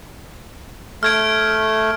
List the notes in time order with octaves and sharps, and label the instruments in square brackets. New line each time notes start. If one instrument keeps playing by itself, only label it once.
[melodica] A3 [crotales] F6 G#6 D7